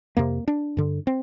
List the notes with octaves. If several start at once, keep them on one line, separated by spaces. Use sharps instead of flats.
F2 C3 A#3
D4
G2 D3
C4